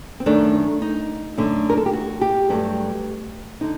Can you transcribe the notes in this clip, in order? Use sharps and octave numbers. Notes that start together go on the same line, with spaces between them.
C4
F#2 D#3 A3 D4
D#4
F#2 D3 A3
A#4
A4
G4
F#4
G4
G2 F#3 A3 G4
D3 D#4